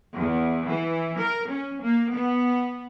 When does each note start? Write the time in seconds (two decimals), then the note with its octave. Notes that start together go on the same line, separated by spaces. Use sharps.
0.14 E2
0.68 E3
1.18 A#4
1.51 C#4
1.82 A#3
2.12 B3